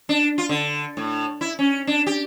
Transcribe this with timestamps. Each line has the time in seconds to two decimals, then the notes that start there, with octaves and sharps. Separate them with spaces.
0.09 D4
0.38 F4
0.49 D3
0.97 A2
1.41 E4
1.59 C#4
1.87 D4
2.07 G4